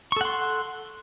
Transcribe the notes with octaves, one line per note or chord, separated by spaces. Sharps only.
A4 F#5 C6 C#6